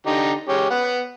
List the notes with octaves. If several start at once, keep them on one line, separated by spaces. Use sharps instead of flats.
D3 D#4 G4
G#3 C#4 G4
B3 F#5